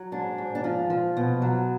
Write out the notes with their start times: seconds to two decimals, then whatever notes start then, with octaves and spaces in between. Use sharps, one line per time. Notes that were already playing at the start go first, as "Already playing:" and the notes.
Already playing: F#3
0.12 G#2 D4
0.38 G#2
0.55 D4
0.64 F3 F4
0.90 F3
1.17 B2
1.42 F#3